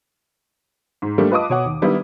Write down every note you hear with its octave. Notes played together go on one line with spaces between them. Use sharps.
G#2
G3 A3 A#3 D4 G4
F4 B4 D#5 A5 D6 D#6
B2 C#5 F#5
D#2
D#3 G3 B3 D4 E4 A#4